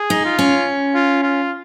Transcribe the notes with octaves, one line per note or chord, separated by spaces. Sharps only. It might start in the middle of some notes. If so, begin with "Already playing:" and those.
Already playing: G#4
D#4
F4
C#4
F4
F4